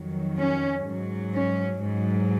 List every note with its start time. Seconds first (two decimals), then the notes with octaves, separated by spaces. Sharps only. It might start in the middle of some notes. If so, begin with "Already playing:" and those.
Already playing: F2 D#3 F#3
0.38 C#4
0.86 G#2 F#3
1.33 C#4
1.81 G#2 F#3